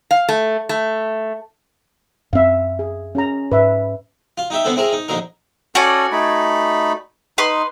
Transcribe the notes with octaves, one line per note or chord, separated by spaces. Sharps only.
F5
A3
A3
F#2 C4 E5 F5
G#4
C#4 G#4 A#5
G#2 B4 E5
F4
D#4 G4 E5
D3 B3 C4 A4
C4 E4 G#4 A#4
D#4
A#1 D3 D#4 A#4
C#4 F#4 A4 D5 G#5
A3 D#4 B5
D#4 B4 C6